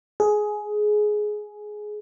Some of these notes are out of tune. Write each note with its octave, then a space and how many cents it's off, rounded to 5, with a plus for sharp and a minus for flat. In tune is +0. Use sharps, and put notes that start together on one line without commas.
G#4 +15